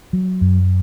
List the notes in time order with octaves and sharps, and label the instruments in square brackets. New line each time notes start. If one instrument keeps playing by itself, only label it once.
[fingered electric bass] F#3
F#2